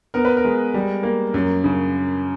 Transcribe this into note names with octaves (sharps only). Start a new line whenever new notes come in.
B3 A#4
B4
A#4
G#3
G3
A#3
F#2
C#3